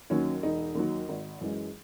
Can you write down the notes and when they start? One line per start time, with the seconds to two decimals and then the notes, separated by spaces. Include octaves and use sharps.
0.10 D#2 D#3 F#3 C#4
0.42 E1 D#4
0.75 D#2 D#3 F#3
1.09 G#1
1.41 F#2 E3 G#3